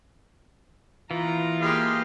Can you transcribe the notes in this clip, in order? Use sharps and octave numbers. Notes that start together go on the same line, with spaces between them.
A#2 E3 B3 F4 A#5
G#3 A#3 G4 B4 F5